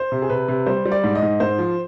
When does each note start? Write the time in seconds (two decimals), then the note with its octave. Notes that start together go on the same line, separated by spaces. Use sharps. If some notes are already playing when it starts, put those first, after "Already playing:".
Already playing: C5
0.12 C3
0.22 G#4
0.30 C3 B4
0.48 C3
0.66 G3 C5
0.85 G3
0.92 D5
1.04 G#2
1.15 D#5
1.22 G#2
1.40 G#2 C5
1.58 F3